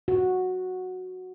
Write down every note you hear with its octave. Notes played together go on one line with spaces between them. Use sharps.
F#4